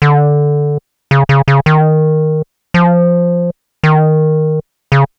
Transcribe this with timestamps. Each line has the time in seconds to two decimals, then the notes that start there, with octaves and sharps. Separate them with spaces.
0.02 D3
1.11 C#3
1.29 C#3
1.48 C#3
1.66 D#3
2.74 F3
3.83 D#3
4.92 C#3